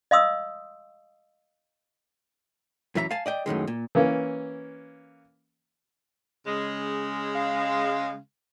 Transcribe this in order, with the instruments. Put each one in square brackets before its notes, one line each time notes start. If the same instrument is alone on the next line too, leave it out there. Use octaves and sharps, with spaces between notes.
[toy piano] D#5 F5 C6 D#6 E6
[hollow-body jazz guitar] F#2 E3 E5 A#5
F5 G#5 A5
D5 D#5 G5
F#2 A2 D#3 G#3
A#2
[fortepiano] E3 A#3 C#4
[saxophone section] C#3 G#3
[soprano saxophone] F5